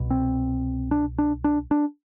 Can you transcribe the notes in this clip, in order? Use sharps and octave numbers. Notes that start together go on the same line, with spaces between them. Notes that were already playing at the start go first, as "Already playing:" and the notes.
Already playing: C2 B2
C4
D4
D4
D4
D4